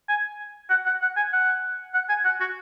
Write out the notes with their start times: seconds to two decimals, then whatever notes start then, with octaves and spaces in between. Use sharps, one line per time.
0.09 G#5
0.70 F#5
0.86 F#5
1.02 F#5
1.16 G#5
1.33 F#5
1.94 F#5
2.09 G#5
2.25 F#5
2.40 F#4